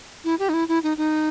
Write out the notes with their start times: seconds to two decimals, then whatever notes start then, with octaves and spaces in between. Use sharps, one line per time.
0.24 E4
0.39 G4
0.49 D#4
0.54 E4
0.68 E4
0.83 D#4
0.98 D#4